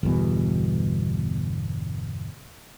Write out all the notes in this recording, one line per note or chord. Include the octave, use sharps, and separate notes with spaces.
G1 E2 B2